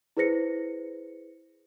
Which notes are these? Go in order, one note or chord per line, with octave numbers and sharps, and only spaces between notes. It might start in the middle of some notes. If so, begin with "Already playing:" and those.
E4 G#4 B4 C5 A#6 C#7